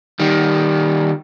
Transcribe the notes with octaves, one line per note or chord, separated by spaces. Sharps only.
D#3 G3